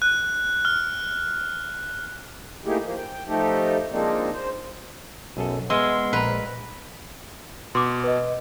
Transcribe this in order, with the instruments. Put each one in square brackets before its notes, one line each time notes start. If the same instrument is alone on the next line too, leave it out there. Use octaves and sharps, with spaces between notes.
[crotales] F#6
F6
[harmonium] A3 A#3 D#4 E4 G4 G#4
F3 A#3
G5
F3 A3 D#4 G4 A4
F3 G#3 A#3 C4 D4 D#4
C5
[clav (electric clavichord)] B1 G#4 A4 [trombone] F#2
[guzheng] G#3 [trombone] B3 [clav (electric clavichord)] D#5 E5 G#5 [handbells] C6 E6 F6
[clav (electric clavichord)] A#1 A#5 [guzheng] B4
[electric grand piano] B2 [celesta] C6 D6
[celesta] B4 D#5